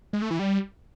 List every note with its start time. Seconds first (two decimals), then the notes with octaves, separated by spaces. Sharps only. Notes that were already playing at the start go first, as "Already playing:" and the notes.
0.13 G#3
0.22 A3
0.31 E3
0.39 G3